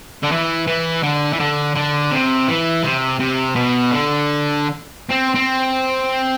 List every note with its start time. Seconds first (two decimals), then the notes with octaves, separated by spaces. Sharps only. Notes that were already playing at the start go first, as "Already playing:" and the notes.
0.23 D3
0.31 E3
0.67 E3
1.03 D3
1.33 E3
1.40 D3
1.75 D3
2.11 C3
2.48 E3
2.83 C3
3.20 C3
3.55 B2
3.91 D3
5.11 C4
5.35 C4